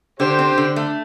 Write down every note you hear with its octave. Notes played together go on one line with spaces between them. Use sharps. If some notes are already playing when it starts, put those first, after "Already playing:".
D3 G4 C5
C4
D3
A3